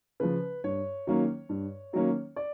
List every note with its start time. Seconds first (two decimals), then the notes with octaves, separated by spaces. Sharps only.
0.20 C#3 F3 B4
0.64 G2 C#5
1.07 D#3 F#3 A#3 C#4
1.49 G2
1.93 D#3 F#3 A#3 C#4
2.36 D5